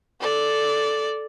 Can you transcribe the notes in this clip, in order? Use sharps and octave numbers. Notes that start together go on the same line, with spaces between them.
A4 D5